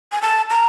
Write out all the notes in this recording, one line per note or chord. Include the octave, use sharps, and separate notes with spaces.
G#5
A5
A#5